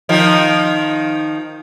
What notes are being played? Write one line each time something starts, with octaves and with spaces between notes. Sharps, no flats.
D#3 F3